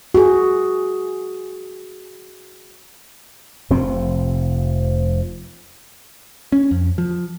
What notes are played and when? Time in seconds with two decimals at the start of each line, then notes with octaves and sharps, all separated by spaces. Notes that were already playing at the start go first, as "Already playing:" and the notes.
0.14 F#4 G#4
3.70 F1 C3 F3 C4
6.52 C#4
6.71 F2
6.98 F3